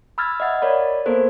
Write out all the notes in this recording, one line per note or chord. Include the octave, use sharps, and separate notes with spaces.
B5 E6 F6 G#6 A6
D#5 E5 F#5 A6
A#4 C#5 D5 B5
A#3 B3 A4 A#4 C5